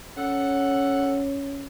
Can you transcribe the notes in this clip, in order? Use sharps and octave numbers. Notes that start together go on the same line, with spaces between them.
C#4 A4 F#5